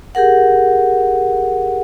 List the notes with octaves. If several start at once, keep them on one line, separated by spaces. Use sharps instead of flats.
G4 G#4 A#4 F#5